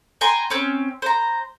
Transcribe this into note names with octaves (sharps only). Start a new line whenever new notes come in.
G5 G#5 A#5 C6
C4 C#4
C5 A#5